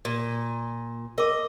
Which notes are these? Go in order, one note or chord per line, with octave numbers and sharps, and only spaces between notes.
A#2
A#4 D#5 D6